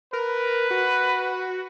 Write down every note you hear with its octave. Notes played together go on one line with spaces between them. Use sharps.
A#4 B4
F#4